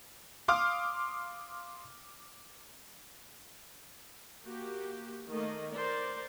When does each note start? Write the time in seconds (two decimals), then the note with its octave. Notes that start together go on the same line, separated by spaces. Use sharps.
0.48 F5 C6 D6 D#6 F6
4.45 A#3 F#4 G4
5.29 D#3 A3 A#3 D#5
5.73 A#4 C5 D5